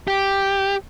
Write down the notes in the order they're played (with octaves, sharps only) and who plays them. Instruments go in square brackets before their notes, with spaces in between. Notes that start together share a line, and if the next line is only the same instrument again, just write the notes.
[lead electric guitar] G4